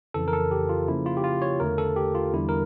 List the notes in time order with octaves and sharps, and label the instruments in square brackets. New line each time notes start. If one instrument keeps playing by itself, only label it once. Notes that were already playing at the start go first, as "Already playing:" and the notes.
[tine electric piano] F2 C#3 E3 A4
A#4
A4
G4
F4
C#3 F3 A#3 E4
F4
G4
F4
C#5
E2 D3 A3 A#4
A4
G4
F4
E2 D3 G3 E4
A#4